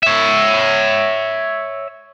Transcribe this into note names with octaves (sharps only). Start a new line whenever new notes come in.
C#5 E5